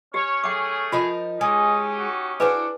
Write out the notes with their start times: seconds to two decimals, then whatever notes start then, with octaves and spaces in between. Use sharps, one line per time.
0.14 C#4 G4 C#5
0.44 A3 G#4 G5 D6
0.92 F3 D#4 F4 A#4
1.41 G#3 C#4 D#4 G4 D#5
1.98 F#4
2.40 D4 E4 F#4 G#4 B4 C5 G#5